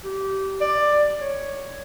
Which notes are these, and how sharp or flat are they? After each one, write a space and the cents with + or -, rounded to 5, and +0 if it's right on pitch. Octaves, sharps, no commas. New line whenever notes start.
G4 -20
D5 +15
C#5 +0